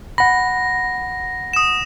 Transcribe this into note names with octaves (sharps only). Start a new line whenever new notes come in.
F#5 B5 A#6
D#6 E7